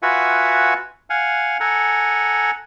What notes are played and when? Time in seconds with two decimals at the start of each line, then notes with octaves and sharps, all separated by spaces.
0.03 F4 F#4 B4 E5 F#5 G#5
1.10 F5 F#5 G#5
1.60 A4 F#5 G#5 A#5